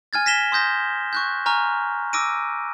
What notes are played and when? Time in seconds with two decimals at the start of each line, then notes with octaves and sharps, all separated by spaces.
0.13 G#5 F6 G#6 A6
0.26 A#6 B6 E7 G7
0.52 C6 D#6 G6 A#6
1.13 C#6 F#6 G6
1.46 G#5 A#5 C#6 F6
2.13 D6 E6 A#6 D7 D#7